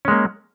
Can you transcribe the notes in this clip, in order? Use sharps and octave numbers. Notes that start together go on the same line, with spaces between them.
G#3 A#3 C#4